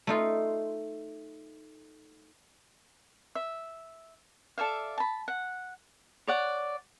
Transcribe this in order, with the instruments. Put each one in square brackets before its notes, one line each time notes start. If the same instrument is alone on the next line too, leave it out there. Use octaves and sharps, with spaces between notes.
[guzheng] A3 D#4 F4
[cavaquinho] E5
A4 D5 E5 F5
A5 B5
F#5
C#5 D5 F#5